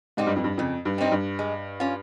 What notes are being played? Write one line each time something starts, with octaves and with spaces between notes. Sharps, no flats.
G#2 G3 C4 D#4
G2
F2
G2
F2 C#3
G2
G3 C4 D#4
G2
G#3
C#4 F4